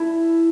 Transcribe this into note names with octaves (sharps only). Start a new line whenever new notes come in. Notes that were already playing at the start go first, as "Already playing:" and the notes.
Already playing: E4 A4